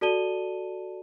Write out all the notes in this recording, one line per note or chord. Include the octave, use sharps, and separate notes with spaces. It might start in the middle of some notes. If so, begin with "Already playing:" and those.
F#4 A4 D5 A5 D#7 G7